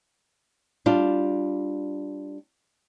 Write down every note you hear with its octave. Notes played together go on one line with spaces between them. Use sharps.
G3 D4 F4